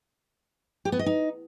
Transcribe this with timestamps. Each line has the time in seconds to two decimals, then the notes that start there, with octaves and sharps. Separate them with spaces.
0.85 G4
0.92 B3
0.99 D#5
1.06 D#4